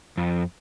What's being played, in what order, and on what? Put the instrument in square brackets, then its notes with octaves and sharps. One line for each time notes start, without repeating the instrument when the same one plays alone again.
[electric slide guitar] F2